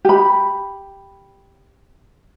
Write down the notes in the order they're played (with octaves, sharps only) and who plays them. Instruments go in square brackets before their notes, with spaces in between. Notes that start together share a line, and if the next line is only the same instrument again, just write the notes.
[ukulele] G4 B5